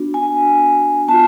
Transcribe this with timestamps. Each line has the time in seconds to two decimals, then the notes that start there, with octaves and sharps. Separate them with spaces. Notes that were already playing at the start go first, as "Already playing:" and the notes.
Already playing: B3 D4 F#4
0.14 G#5
1.08 B3 F4 A5